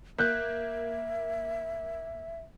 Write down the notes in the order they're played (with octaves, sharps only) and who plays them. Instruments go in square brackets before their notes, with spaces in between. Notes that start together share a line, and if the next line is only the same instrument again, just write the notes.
[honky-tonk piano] A#3 [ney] E5 [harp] F#6 G6 B6